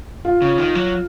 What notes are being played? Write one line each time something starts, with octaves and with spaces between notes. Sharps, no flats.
F4
C#3
D#3
F#3